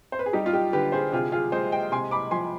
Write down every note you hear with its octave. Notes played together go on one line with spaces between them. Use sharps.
C5
B4
G#4
G3 D#4 G4
F4
D#4 G4
D3 G4 B4
G#4 C5
C3 F4 G#4
F4 G#4
G#3 C5 D#5
D#5 G5
C3 G#5 C6
B5 D6
F3 G#5 C6